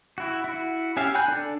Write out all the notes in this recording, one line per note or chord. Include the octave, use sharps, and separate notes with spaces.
E4 F#4
E4 F#4
C#4 G4 E5 F5
G5 G#5 B5 F#6 G6
D4 A4 D5